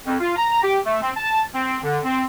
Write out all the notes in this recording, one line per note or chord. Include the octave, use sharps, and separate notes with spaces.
F2
F4
A#5
G4
A3
C4
A5
C4
D3
C4